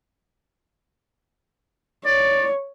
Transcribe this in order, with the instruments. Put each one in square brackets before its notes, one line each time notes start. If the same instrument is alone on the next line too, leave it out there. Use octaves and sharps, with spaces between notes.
[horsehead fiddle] C#5 [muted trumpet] D5